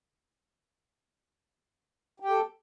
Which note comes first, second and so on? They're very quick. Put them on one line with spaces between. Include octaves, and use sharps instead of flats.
G4 G5 A4